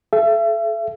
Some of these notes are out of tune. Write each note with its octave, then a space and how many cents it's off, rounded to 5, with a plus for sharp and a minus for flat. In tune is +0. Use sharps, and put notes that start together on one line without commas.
A4 -35 E5 +35